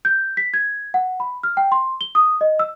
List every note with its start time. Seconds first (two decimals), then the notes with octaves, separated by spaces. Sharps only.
0.05 G6
0.37 B6
0.54 G#6
0.94 F#5
1.20 B5
1.43 F6
1.57 G5
1.72 C6
2.01 G7
2.15 D#6
2.41 D#5
2.59 E6